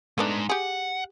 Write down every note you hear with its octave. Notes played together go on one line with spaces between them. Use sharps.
G#3 A3 B3 D4 D#4
G4 G#4 F#5